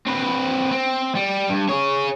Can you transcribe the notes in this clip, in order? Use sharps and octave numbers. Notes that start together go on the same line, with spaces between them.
C4 B4
C4
G3
G2
G#4 C#5